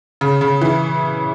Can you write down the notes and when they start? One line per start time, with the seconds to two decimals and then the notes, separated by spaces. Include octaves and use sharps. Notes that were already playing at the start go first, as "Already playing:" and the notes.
0.21 C#3
0.41 C#3
0.62 E3